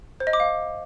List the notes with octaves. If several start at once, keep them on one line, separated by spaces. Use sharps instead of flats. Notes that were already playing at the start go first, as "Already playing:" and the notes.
C5
D#5
D6
F5